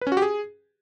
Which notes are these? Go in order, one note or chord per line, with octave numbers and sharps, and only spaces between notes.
B4
C#4
F#4
G4
G#4